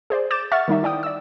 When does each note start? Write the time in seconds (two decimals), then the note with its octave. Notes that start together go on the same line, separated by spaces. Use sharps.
0.10 G#4 C5 D5
0.31 D6 G6 A6 E7
0.52 E5 F#5 C#6 F6 A6
0.68 D#3 G3 D#4 E5
0.83 E4 D5 G5 D#6
1.03 D5 E6